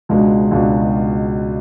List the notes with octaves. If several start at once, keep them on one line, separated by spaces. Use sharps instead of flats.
C#2 B2 G#3 D4 F#4
C#2 B2 G#3 D4 F#4